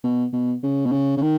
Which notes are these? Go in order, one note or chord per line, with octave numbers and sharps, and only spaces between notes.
B2
B2
C#3
B2
C#3
C#3
D#3